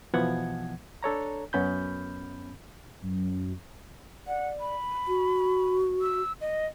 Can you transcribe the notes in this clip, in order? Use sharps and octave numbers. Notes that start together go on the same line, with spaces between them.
B2 E3 F3 B3 F#5 G#6
D4 A4 C#5 A#5
F#2 B3 C#4 B5 G6
F#2
D5 F#5
B5
F#4
E6
D#5